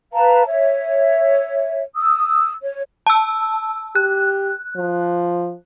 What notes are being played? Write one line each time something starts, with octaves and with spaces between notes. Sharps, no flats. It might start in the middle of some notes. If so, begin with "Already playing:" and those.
B4 F5 A5 A#5
C#5 E5
D#6 E6
C#5
A5 E6
G4 F#6
F3